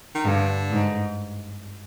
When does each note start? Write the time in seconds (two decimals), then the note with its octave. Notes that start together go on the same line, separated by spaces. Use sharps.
0.15 D#3
0.26 G2 D3
0.71 G#2